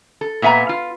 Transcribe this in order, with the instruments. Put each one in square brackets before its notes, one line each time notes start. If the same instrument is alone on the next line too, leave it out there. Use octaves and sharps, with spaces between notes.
[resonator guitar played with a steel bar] A4
A#2 B3 E5 G#5 A#5
F4